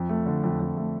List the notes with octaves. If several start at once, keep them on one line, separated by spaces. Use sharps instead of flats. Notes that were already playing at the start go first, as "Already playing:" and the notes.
Already playing: F2
A3
D3
F2
F2
A3